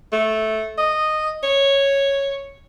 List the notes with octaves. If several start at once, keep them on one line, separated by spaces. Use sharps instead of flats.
A3
D#5
C#5